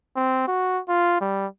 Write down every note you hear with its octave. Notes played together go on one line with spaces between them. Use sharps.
C4
F#4
F4
G3